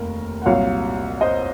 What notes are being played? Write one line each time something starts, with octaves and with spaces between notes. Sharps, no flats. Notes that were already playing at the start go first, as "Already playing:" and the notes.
Already playing: F1 D#2 A#4
F#5
C2 A#2 F#3 C#5 F5
C5 D#5